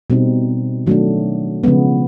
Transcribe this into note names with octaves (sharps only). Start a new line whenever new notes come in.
B2 G3 C4 D#4
D#3 F#3 A3 D4
C#3 F3 G#3 B3